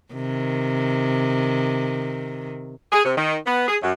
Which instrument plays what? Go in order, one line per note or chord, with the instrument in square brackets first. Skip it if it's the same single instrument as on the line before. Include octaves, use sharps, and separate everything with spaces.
[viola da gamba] C3 D#3
[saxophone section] G#4
C3
D#3
B3
G#4
F#2